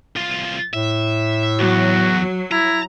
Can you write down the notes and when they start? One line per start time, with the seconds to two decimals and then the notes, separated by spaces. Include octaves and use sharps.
0.16 C2 F4
0.74 A2 E5
1.60 E2 F#3 F#4
2.52 E4 A#5